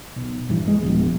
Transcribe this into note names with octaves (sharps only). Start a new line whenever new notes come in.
B1
A#1 G2 E3
G#3
E1 A#1